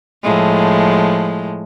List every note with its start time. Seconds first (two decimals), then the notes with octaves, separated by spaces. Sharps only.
0.23 A2 F3 G#3